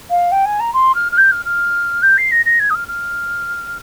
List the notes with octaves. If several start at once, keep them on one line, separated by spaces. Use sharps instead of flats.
F5
G5
G#5
A#5
C6
F6
F6
G6
F6
F6
G6
C7
A#6
A#6
G#6
D#6
F6
F6